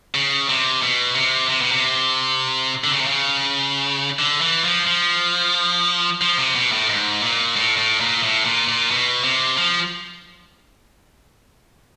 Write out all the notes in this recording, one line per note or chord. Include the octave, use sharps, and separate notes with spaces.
C#3
C3
B2
C3
C3
B2
C3
D3
C#3
C3
C#3
D3
E3
F3
F3
F3
C3
B2
A2
G#2
A#2
A2
A2
A#2
A2
A#2
A#2
B2
C3
F3